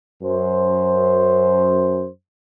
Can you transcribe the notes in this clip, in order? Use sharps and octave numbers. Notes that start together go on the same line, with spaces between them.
F#2 C5